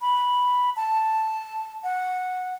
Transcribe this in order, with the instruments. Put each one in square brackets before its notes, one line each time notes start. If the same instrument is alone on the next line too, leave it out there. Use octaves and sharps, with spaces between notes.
[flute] B5
A5
F#5